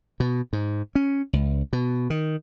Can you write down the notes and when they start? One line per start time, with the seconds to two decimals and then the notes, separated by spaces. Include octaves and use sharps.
0.20 B2
0.53 G#2
0.95 C#4
1.33 C#2
1.73 B2
2.10 D#3